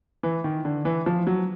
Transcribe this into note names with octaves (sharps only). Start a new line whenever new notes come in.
E3
D#3
D3
E3
F3
F#3